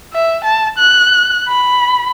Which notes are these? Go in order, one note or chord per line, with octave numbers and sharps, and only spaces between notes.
E5
A5
F#6
B5